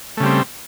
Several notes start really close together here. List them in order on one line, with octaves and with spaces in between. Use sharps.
A3 C#3 G3 C4